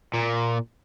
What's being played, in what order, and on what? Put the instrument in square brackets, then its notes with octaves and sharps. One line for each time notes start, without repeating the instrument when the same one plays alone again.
[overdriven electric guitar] A#2